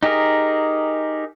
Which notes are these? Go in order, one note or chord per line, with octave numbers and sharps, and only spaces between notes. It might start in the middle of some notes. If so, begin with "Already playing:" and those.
D#4 G4 G#4 A#4